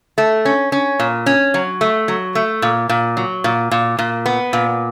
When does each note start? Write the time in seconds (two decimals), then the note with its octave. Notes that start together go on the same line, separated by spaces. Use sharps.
0.18 A3
0.45 C#4
0.72 C#4
0.99 A#2
1.26 C#4
1.54 F#3
1.81 A3
2.08 F#3
2.35 A3
2.62 A#2
2.89 A#2
3.17 F#3
3.44 A#2
3.71 A#2
3.99 A#2
4.26 B3
4.53 A#2